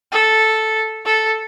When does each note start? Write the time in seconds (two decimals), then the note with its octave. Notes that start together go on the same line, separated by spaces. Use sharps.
0.12 A4
1.06 A4